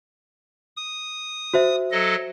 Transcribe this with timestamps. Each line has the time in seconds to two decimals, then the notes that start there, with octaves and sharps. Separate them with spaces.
0.77 D#6
1.54 F#4 C5 E5
1.92 F#3 A4 D#5